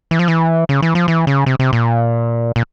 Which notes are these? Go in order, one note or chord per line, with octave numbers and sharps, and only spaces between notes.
E3
F3
E3
C#3
E3
F3
E3
C#3
C3
C3
A#2
A#2